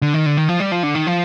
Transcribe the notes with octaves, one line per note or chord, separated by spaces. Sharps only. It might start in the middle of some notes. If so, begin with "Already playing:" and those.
D3
D#3
D3
D#3
F3
G3
F3
D3
D#3
F3